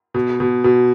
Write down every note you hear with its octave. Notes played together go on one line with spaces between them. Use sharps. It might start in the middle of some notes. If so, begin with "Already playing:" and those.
B2
B2
B2